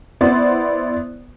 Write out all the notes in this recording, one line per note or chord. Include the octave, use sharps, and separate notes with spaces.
B3 E4 C5 D5